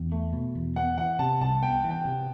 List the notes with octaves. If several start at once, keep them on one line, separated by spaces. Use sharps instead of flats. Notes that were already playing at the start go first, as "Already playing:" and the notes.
Already playing: E2
A3
B2
E2
B3 F#5
E3 F#5
C3 A5
C2 A5
B3 G5
E3
G5
C3